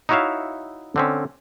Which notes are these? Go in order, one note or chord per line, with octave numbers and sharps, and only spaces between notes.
D#4 E4 F#4 C#5 E5 F5
D3 C4 C#4